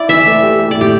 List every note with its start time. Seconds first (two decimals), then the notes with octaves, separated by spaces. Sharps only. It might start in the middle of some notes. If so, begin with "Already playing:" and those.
Already playing: E4 D5
0.09 E3 E5
0.26 A3
0.42 G4
0.59 A3
0.71 D5
0.76 A2 G4